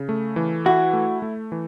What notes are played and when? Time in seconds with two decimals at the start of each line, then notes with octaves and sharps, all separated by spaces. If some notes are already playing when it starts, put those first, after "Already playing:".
Already playing: C#3
0.09 A3
0.36 E3
0.66 E4 F#4
0.93 A3
1.22 A3
1.52 E3